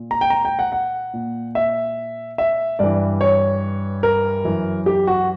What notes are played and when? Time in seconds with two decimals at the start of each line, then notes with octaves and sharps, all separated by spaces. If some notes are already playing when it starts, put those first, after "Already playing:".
Already playing: A#2
0.11 A#5
0.21 G5
0.30 A#5
0.45 G5
0.59 F#5
0.72 F#5
1.14 A#2
1.55 E5
2.38 E5
2.79 G2 E3 D5
3.21 C#5
4.03 A#4
4.45 F#2 E3
4.86 G4
5.07 F#4